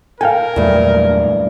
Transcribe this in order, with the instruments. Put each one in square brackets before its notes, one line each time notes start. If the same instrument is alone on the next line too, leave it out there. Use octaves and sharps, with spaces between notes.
[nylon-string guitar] A4 [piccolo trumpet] A#4 [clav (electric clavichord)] F5 G5 G#5
[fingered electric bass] E2 A#2 F#3 [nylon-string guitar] G2 A3